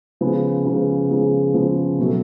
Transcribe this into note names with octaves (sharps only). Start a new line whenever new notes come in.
C#3 F3 G#3 B3
C#3 F3 G#3 B3
C#3 F3 G#3 B3
C#3 F3 G#3 B3
B2 F#3 A3